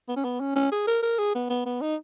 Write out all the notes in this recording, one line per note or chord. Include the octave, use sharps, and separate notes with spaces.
B3
C#4
B3
C#4
C#4
G#4
A#4
A#4
G#4
B3
B3
B3
D#4